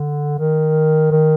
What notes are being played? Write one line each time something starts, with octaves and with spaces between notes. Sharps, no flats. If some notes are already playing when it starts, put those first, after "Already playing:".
Already playing: D3
D#3
D#3